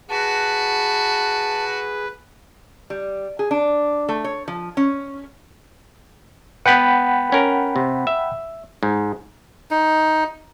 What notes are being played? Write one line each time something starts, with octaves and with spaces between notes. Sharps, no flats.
F#4 G#4 B4 A5
G3
G#4
D4
A3
C#5
F3
C#4
B3 B4 F#5 G5 B5
C#4 A#4
C3
E5
G#2
D#4